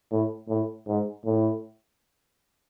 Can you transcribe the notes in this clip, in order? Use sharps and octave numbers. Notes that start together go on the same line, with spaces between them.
A2
A2
G#2
A2